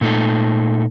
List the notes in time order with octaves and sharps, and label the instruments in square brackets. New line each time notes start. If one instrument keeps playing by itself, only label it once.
[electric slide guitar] A#2 A3 D#4 A4